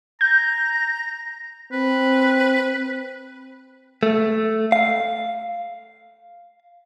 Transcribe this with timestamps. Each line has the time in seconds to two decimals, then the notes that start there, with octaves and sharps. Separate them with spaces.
0.21 A#5 G6
1.72 C4 B4
4.03 A3
4.72 F5